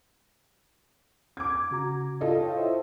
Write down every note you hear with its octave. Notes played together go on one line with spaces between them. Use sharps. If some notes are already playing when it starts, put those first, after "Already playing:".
D6 G#6
C#3 F#4 A#5
F4 A4 D#5
C#5 F5 G5
E4 C5 E5